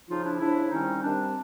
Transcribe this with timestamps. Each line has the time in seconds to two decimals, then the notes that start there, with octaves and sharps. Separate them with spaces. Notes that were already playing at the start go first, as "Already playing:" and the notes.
0.09 C#3 F3 D#4 F4
0.25 D4 E4
0.40 C#3 F3 D4 E4
0.71 C3 D#3 G3 C#4 D#4
1.02 C3 D#3 G3 C4 D4